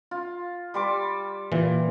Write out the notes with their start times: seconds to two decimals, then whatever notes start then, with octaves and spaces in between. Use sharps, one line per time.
0.11 F4
0.74 G3 C6 D6
1.52 A#2 E3